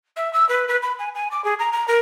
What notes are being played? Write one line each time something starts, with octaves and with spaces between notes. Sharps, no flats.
E5
E6
B4
B4
B5
G#5
G#5
D6
G#4
A#5
A#5
A#4